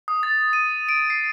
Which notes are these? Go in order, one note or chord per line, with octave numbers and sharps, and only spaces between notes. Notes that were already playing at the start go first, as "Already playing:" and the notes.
D#6
A6
D#7
D7
C7